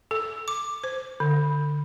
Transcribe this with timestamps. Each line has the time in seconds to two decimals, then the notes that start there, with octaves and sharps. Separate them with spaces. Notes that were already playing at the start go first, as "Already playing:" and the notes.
0.11 A4
0.48 D6
0.84 C5
1.20 D3